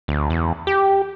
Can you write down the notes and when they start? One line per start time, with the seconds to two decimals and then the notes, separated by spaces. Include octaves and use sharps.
0.08 D2
0.30 E2
0.67 G4